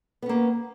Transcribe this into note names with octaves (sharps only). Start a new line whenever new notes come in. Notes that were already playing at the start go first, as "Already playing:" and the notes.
A#3 B3 C#4